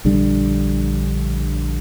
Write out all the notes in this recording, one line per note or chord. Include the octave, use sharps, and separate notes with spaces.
A#1 D3 G3 D4